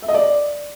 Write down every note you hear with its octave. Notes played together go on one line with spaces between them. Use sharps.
E5
D#5
D5